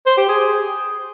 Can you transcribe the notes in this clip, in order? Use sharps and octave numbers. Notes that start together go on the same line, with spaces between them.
C5
G4
G#4